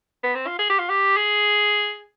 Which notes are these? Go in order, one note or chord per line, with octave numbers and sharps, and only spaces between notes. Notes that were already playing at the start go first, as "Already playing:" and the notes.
B3
C4
F4
G#4
G4
F4
G4
G#4